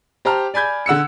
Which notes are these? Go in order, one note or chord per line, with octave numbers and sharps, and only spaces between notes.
G4 C5 A5 A#5 F6
D5 G#5 B5 G6 G#6
D3 F#5 E6 C#7